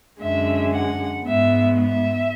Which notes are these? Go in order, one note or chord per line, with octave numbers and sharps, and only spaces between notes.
F#2 D3 G#3 E5
F#5
G#2 G#3 B3 E5
E5